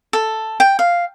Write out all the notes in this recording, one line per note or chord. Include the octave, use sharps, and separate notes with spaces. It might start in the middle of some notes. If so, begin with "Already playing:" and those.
A4
G5
F5